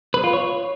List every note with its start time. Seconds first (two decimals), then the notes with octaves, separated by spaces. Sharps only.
0.14 B4
0.24 F4
0.33 C#5